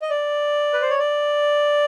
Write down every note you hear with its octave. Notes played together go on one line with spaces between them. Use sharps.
D#5
D5
B4
C5
C#5
D5